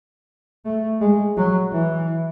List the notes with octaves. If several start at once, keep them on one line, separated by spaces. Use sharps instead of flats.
A3
G#3
F#3
E3